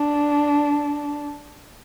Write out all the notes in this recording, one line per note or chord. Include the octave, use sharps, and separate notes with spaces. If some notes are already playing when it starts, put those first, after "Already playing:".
Already playing: D4